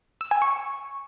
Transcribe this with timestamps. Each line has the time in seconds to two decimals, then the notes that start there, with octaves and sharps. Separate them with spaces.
0.21 E6
0.31 G#5
0.42 C#6